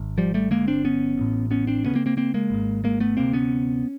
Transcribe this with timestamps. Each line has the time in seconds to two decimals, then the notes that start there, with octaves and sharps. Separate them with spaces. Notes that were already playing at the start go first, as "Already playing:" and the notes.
Already playing: G#1
0.18 F3 G3
0.34 G3 A3
0.51 G1 F2 D3 G#3 A#3
0.68 C4 D4
0.85 B3 C#4
1.18 A1 A2
1.51 B3 C#4
1.67 C4 D4
1.84 D2 C#3 B3 C#4
1.95 A#3 C4
2.06 A#3 C4
2.17 A#3 C4
2.34 G#3 A#3
2.50 G#1 G#2
2.84 G#3 A#3
3.00 A3 B3
3.17 D2 C3 A#3 C4
3.33 B3 C#4